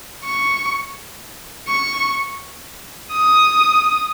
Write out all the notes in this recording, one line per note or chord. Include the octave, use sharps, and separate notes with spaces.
C#6
C#6
D#6